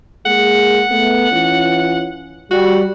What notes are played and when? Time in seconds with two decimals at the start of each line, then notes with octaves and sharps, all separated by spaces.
0.26 G#3 A#3 G#4 F#5
0.90 A3 B3
1.31 E3 C#4 F4
2.51 G3 F#4